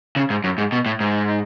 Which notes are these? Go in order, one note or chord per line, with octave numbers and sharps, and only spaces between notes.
C#3
G#2
F#2
G#2
B2
A2
G#2